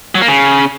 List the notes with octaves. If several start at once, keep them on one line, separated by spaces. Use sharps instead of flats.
F#3
A#3
C#3